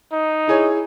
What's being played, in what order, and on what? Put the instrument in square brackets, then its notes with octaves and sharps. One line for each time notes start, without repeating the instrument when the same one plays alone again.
[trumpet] D#4
[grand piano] E4 G#4 C#5